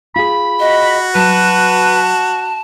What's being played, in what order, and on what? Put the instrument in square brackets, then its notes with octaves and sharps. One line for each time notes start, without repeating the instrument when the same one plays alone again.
[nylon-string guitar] F4 G#4 [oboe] B5
[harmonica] F#4 [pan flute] D#5
[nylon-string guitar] F#3 [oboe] B4 [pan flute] A5